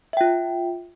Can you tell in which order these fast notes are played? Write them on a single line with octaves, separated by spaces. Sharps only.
E5 G5 F4